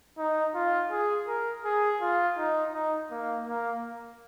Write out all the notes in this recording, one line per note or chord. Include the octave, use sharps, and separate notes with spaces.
D#4
F4
G#4
A#4
G#4
F4
D#4
D#4
A#3
A#3